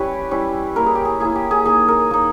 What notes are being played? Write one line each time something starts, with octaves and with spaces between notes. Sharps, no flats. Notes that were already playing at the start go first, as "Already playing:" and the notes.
Already playing: G3 C#4 E4 G4 B4 C#5
G3 C#4 E4
A#3 E4 A#4
G#4
G4
G#4
A#3 E4 G#4
G4
G#4
A#3 D#4 G#4
A#4
A#3 D#4